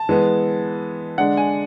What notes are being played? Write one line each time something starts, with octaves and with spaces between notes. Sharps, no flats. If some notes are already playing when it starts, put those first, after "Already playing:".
Already playing: A5
E3 G#3 B3
D3 G#3 D4 F#5
G#5